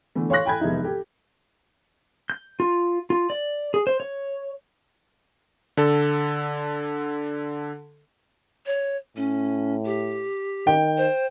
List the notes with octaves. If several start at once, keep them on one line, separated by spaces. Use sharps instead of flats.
B2 D3 E3 A3
C#5 F5 C6 C#6 F#6 A#6
G5 G#5 B5 G6 G#6
F1 E2 G#3 D#4 E5
G4 A4
G6
F4
F4
D5
G#4
C5
C#5
D3 A4
C#5
A2 C#4
G4
D#3 G5
C5